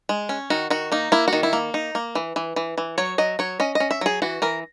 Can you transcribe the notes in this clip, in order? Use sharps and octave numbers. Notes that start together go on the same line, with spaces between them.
G#3
C#4
D#3 F#4
D#3 F#4
A#3 D#4
A#3 E4
F#4
D#3
E4
A#3
D#4
A#3
E3
E3
E3
E3
F#3 C#5
F#3 D#5
F#3 C#5
C#4 D#5
D#5
C#4
E5
F#3 G#4
E3 F#4
E3 A#4